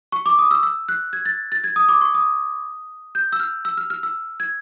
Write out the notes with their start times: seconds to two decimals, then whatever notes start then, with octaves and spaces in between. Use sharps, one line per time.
0.12 C#6
0.26 D6
0.39 D#6
0.51 E6
0.63 E6
0.89 F#6
1.13 G#6
1.25 A6
1.52 A6
1.64 G#6
1.76 D#6
1.89 D6
2.01 C#6
2.14 D#6
3.15 G6
3.32 E6
3.40 F6
3.65 E6
3.77 F6
3.90 F6
4.03 E6
4.40 G#6